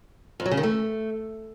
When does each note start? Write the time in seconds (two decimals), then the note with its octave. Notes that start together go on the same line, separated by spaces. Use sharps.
0.40 F2
0.46 F#3
0.51 C#3
0.57 D#3
0.63 A3